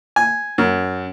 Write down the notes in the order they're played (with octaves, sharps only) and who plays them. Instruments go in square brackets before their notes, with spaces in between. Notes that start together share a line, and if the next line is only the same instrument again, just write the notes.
[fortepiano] G#5
F#2